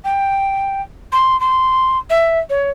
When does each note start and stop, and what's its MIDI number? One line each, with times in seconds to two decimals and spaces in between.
0.05 0.82 79
1.12 1.39 84
1.40 1.98 84
2.10 2.39 76
2.50 2.70 73